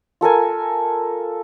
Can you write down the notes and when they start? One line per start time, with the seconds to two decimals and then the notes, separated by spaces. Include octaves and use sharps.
0.21 F4 A4 A#4 G#5